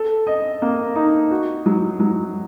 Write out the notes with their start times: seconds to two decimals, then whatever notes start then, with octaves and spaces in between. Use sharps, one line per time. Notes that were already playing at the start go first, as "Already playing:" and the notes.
Already playing: A4
0.27 D#5
0.62 A#3
0.96 D#4
1.31 F#4
1.66 F#3
2.00 F#3